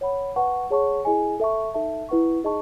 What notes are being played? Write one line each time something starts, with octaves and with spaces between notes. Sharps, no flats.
C#5 F#5 B5
B4 F#5 A5 C#6
G#4 C#5 F#5 A5 C#6
E4 G#4 D#5 G#5
A4 E5 A5 C#6
D#4 A4 E5 A5
E4 B4 F#5 C#6
D#4 G#4 D#5 A5 C#6